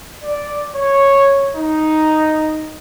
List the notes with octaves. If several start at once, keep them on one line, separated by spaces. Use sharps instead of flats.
D5
C#5
D#4